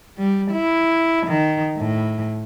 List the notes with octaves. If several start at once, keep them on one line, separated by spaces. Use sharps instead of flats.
G3
E4
D#3
A2